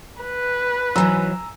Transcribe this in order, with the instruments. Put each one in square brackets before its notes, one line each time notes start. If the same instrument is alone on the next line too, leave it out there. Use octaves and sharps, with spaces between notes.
[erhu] B4
[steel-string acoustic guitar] G#2 E3 F#3 [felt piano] G#5 A#5 E6